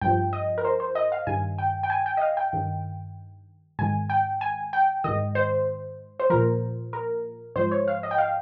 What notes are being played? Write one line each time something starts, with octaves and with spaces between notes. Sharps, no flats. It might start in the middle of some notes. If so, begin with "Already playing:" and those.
G2 F3 G5
D#5
A#4
C5
C5
D#5
F5
G2 D#3 G#5
G5
G5
G#5
G5
D#5
F5
G5
G2 D#3
G#2 D#3 G#5
G5
G#5
G5
G#2 D#3 D#5
C5
C5
A#2 F3 A#4
A#4
G#2 F3 C5
C#5
F5
D#5
G5
F5